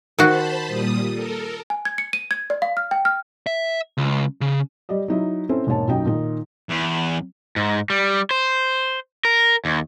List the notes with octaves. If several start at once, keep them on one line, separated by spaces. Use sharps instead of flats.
D#3 F#4 C5 A5 B5
A#2 G3 D#6
A4 A#4
G#5
G#6
C#7
D#7
G#6
D5
F5
F6
G5
F6
E5
C#2
C#3
G3 G4 D5 D#5
F#3 D#4 E4
C4 C#4 E4 A4 C5
E1 G#2 A#3 C#5 A5
B1 F#2 F#3 D#4 G5
A#2 D#3 D#4
E2
G#2
G3
C5
A#4
D#2